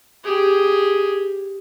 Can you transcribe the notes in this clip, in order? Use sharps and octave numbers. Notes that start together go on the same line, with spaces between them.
G4 G#4